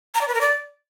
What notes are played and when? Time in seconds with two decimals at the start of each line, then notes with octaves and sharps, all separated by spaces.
0.15 A#5
0.21 D5
0.28 B4
0.34 A#4
0.41 D5